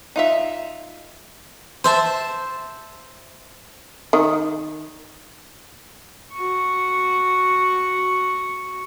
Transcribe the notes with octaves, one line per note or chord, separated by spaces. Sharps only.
D#4 F4 E5
C5 E5 A5
D#3
F#4 C#6